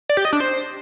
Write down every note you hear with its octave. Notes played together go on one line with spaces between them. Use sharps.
D5
G4
D#5
D4
C5